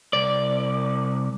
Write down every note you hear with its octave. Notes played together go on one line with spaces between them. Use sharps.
C2 D5